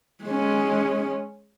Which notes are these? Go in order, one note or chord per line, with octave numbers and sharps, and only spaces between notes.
G#3 C#4